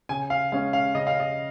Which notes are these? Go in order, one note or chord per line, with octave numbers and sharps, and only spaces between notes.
C#3 G#5
F5
G#3 C#4 F5
F5
C#3 D#5
F5
D#5